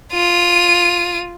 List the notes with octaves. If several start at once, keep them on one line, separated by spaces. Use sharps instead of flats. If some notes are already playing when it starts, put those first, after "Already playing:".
F4 D#7